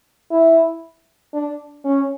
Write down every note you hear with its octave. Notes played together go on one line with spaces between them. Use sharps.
E4
D4
C#4